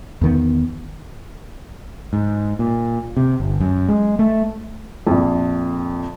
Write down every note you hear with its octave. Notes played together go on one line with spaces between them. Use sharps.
E2 D#3 B3
G#2
A#2
C3
G1
F#2
G#3
A3
A#1 F2